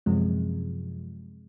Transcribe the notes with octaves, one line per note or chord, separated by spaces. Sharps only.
F#2 C3 F3 G#3